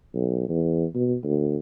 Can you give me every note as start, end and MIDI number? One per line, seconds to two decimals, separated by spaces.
0.14 0.49 35
0.49 0.85 40
0.95 1.15 47
1.24 1.56 38